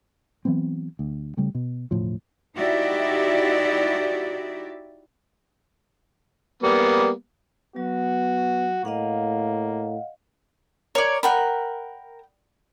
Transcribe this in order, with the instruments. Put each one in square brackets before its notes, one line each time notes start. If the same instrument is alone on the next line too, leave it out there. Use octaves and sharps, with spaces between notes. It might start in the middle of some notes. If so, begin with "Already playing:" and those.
[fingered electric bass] E3 F#3 B3 C4
D2
C#3 G3 A3
B2
E1 D2 A2 F3
[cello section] D#4 E4 F#4 G4 D5 E5
[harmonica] G3 A#3 B3
[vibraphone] F#3 [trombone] B3 [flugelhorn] F#4
[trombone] A2 [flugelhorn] A#3 [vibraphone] D#5 F5 F#5
[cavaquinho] A#4 [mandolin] C#5 D5
[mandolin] A#4 [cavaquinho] F#5 G5 B5